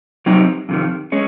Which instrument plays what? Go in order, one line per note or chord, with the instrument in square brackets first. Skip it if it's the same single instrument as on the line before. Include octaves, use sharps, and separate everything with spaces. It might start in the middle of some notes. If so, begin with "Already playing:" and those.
[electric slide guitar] C3 F#3 C4 D#4
F2 C3 D#3
G#3 C#4